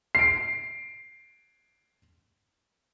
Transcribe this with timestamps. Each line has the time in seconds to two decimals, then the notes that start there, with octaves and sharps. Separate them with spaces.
0.15 C7 D7